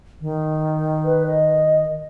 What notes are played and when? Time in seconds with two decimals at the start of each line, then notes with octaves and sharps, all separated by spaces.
0.21 D#3
1.04 B4
1.27 D#5